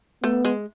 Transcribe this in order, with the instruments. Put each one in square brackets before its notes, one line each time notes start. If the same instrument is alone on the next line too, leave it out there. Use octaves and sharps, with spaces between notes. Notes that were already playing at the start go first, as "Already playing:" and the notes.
[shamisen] A3 [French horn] B3
[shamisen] G#3